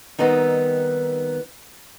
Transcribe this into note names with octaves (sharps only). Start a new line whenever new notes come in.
D#3 G3 G#3 B3 C4 D#4